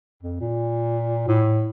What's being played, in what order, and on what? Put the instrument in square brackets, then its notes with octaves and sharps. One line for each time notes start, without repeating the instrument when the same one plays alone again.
[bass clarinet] F2
A#2
A2